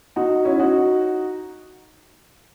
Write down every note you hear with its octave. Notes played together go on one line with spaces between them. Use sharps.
D#4 F#4
C#4 E4
D#4 F#4